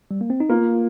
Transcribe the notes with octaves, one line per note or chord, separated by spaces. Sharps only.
G3
A#3
C4
D#4
A#3 F4